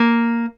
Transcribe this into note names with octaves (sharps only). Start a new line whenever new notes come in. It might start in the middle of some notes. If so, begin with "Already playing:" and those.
Already playing: A#3